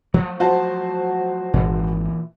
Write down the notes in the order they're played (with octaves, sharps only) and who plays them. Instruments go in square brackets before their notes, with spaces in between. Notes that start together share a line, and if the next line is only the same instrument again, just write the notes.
[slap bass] F3 F#3 A3
[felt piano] F#4 C5 A5
[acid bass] G#1 [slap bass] A#2 E3